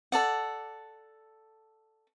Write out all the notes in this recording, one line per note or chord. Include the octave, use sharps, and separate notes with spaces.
A4 D5 F#5